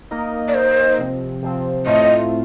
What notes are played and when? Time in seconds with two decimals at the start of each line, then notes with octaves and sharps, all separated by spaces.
0.11 A#3 D#4 A#4 D#5
0.48 D5
0.54 A#3 D#4 A#4 C5 D#5
0.98 C3 F3 C4
1.43 C3 F3 C4
1.86 A2 A3 C4 F4 D#5